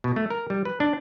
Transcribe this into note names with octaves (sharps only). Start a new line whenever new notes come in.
B2
A3
A#4
G3
B4
D4